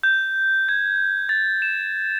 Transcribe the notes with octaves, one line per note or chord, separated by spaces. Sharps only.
G6
G#6
A6
E7